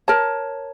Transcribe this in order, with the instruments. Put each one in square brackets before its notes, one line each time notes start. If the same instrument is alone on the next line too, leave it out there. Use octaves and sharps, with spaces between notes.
[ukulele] A#4 C#5 A5